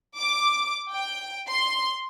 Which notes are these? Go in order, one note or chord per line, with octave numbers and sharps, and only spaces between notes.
D6
G5
C6